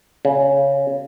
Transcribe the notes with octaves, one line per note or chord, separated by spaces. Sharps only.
C#3